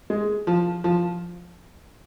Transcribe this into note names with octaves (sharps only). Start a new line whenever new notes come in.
G#3
F3
F3